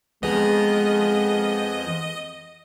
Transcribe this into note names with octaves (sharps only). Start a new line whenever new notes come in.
F2 G#3 B3 G#4 D#5